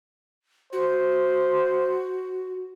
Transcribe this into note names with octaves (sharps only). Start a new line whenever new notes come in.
F#4 C5